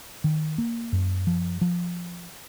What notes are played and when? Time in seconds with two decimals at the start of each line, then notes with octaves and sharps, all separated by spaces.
0.24 D#3
0.58 A#3
0.92 F#2
1.27 F3
1.61 F3